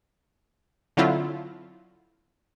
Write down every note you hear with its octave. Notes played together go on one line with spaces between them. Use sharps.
D3 F#3 C4 E4 F4